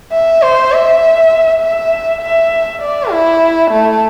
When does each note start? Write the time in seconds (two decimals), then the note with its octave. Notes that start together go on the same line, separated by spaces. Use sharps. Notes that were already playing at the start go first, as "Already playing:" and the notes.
0.12 E5
0.42 C5
0.72 E5
1.61 E5
2.22 E5
2.82 D5
3.11 E4
3.71 A3